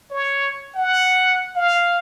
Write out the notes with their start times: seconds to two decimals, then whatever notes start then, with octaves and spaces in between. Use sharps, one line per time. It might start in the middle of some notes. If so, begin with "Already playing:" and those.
0.10 C#5
0.75 F#5
1.55 F5